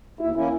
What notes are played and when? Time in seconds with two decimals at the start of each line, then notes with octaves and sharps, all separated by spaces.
0.19 D#2 E4
0.35 D#3 A#3 C#4 E4